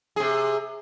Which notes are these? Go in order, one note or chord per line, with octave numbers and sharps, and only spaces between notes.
C3 G#4